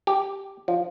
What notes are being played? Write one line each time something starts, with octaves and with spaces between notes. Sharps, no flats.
G4
F3